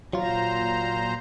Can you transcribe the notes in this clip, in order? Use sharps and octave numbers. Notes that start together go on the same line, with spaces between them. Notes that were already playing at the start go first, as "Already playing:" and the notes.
A#2 F#3 F4 C5 A#5